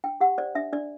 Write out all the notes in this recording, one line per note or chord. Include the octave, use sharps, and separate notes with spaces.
D4 G5
G4 F#5
C5 D5
D4 E5
D4 D5